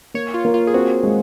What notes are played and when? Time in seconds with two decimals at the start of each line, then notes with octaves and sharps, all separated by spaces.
0.14 A#3 C#5
0.34 F4
0.45 A#3
0.54 F4
0.67 G#4
0.74 C4 F#4
1.03 G#3